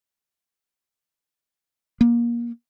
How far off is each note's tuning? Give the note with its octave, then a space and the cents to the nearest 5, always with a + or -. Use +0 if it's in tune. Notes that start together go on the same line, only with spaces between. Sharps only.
A#3 +25